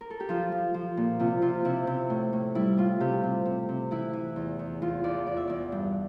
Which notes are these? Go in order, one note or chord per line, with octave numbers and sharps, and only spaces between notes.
A#4
A4
G4
F3 F4
F3
F3
A#2
C3 F4
C3 F4
C3 E4
C3
A2
A2
G3 E4
A2 F4
C3 G4
C3
C3
C3
E3 E4
E3
E2
E2
E2 F4
E2 D5
E2 D5
E5
E2 D5
G2